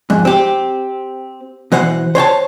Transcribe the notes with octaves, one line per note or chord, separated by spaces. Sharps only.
F2 G#2
C4 G4
B2 E3 C5 F#5
C5 C#5 G5 A5